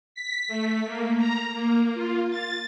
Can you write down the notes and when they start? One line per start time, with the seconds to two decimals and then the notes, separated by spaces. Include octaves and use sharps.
0.15 B6
0.48 A3
0.86 A#3
1.18 A#5
1.54 A#3
1.94 F4
2.30 A6